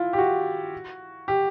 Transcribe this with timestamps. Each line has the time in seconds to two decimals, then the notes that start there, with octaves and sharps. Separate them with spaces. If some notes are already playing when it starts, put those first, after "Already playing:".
Already playing: E4 F4
0.13 G4
0.18 F#4
1.28 G4